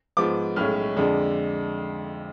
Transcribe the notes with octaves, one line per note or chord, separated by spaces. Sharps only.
G#2 F3 B3 D6
B1 A2 G#3 C#4 F6
F2 D3 G#3 D4